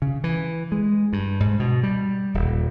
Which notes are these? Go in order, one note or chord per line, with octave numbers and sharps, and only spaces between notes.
C#3
E3
G#3
G2
G#2
B2
G3
D#1